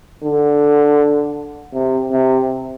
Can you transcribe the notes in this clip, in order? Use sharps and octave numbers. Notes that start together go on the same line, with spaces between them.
D3
C3
C3